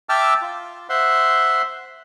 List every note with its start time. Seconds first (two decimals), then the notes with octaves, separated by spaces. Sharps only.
0.09 E5 G5 A5 D6 E6 F6
0.42 F4
0.89 C5 E5 F#5 C6